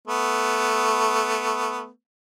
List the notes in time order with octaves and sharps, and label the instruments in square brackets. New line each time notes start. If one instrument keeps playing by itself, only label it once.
[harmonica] A3 B3